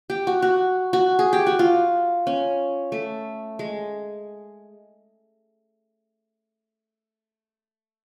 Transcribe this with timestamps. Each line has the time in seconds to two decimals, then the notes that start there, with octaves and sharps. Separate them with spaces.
0.10 G4
0.27 F#4
0.42 F#4
0.93 F#4
1.19 G#4
1.33 G4
1.47 F#4
1.59 F4
2.27 C#4
2.92 A3
3.59 G#3